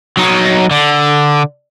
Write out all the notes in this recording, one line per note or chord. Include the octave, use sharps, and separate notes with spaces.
F#3 D#4
D3